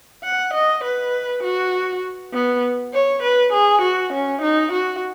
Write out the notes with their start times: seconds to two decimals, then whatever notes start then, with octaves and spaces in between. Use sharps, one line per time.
0.24 F#5
0.54 D#5
0.84 B4
1.43 F#4
2.33 B3
2.93 C#5
3.23 B4
3.53 G#4
3.82 F#4
4.13 C#4
4.42 D#4
4.73 F#4